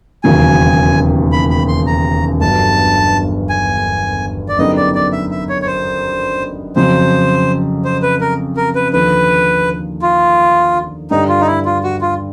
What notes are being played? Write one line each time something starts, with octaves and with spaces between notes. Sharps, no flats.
E1 D#2 C#3 F#3 G#5
B5
B5
C6
A#5
G1 G2 D3 F#3 A5
G#5
D5
F#2 D3 G3 B3 D#4 D#5
D5
D5
E5
E5
C#5
C#5
C5
F2 C#3 F#3 C5
C5
B4
A#4
A#4
B4
D#2 D3 F3 B4
F4
G2 D3 G3 D#4
F4
D#4
E4
F4
F#4
F4